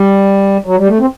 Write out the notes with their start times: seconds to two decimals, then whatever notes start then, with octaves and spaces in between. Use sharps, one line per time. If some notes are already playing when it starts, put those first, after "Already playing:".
Already playing: G3
0.66 F#3
0.78 G3
0.88 A3
1.00 C4